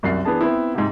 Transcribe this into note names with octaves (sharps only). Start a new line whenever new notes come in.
C2 F#2 C7
E3 B3 D4 G#4 A5
B3 C4 E4
G#2 C3